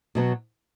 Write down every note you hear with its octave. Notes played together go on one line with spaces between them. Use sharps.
B2 F#3 B3